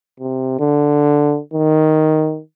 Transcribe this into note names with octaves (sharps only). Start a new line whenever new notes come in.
C3
D3
D#3